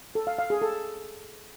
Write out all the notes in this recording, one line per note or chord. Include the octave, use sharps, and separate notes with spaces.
A4
F5
F5
G#4
A4